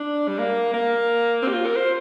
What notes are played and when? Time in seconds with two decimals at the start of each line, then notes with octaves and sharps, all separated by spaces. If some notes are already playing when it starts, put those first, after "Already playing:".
Already playing: D4
0.28 G3
0.39 A#3
0.74 A#3
1.43 C4
1.48 G4
1.54 F4
1.66 A#4
1.76 C5